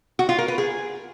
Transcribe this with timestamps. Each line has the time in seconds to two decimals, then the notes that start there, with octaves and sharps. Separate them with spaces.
0.19 F#4
0.29 F4
0.38 A#4
0.48 B4
0.58 G#4